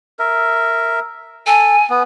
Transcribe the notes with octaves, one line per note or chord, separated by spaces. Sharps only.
A#4 E5
A4 G#5
B3